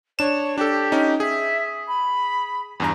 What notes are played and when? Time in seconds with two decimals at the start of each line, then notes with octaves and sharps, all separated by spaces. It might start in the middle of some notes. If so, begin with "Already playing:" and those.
0.19 D4 C#5 E7
0.58 D4 G4 A4
0.92 C#4 D#4
1.20 G#4 E5
1.87 B5
2.80 E2 G2 A#5